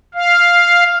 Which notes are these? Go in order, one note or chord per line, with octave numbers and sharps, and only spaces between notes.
F5